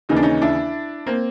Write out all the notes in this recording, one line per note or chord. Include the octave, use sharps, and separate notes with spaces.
D#2 C#3 E3 D#4
D4
C#4 D#4
D4 E4
A#3 C4